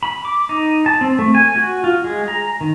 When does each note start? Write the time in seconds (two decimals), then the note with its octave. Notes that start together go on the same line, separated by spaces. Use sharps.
0.03 B5
0.25 D6
0.49 D#4
0.86 A5
1.01 C4
1.19 A3
1.35 G#5
1.56 F#4
1.84 F4
2.04 G#3
2.28 A#5
2.61 D#3